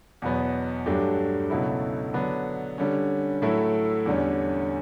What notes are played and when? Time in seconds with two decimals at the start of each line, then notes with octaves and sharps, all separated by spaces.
0.22 E2 B2 F#3 B3
0.86 G2 F#3 A3 D4 G4
1.50 C#2 B2 F#3 A3 E4
2.14 D3 F#3 B3 D4
2.78 D3 G3 C#4
3.42 A2 F#3 A3 E4
4.06 E2 D3 G3 C#4